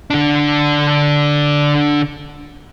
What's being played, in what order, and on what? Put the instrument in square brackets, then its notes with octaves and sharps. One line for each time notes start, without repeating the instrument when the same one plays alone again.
[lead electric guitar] D3 D4